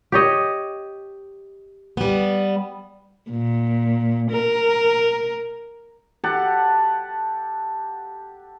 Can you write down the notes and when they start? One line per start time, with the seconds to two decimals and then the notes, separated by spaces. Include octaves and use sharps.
0.12 G4 C#5 D#5
1.97 G3 B3
3.31 A#2
4.31 A#4
6.24 G4 A4 F#5 A5